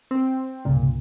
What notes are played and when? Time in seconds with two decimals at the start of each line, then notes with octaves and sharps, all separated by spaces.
0.11 C4
0.65 C2 G2 A#2 C#3